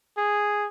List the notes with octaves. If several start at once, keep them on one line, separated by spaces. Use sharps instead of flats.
G#4